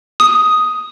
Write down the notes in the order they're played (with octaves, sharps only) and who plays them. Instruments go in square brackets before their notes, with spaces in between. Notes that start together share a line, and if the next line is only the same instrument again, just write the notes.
[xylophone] D#6